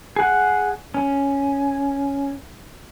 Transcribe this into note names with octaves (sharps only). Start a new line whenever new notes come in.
G#4 F#5
C#4